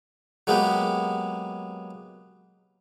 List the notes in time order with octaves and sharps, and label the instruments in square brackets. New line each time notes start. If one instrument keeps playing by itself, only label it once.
[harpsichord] F#3 G#3 A#3 B3 G4